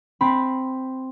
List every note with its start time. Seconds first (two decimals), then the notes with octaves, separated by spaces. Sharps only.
0.21 C4 B5